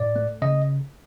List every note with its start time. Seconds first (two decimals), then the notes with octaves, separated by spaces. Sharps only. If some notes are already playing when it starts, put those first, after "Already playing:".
Already playing: A2 D5
0.16 A3
0.42 C#3 D#5